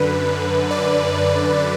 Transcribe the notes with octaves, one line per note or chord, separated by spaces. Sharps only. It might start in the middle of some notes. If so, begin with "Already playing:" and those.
Already playing: F#2 D3 B4
D5